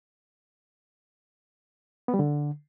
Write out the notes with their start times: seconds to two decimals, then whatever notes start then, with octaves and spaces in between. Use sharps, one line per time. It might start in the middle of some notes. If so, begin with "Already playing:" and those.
2.08 B3
2.14 G3
2.19 D3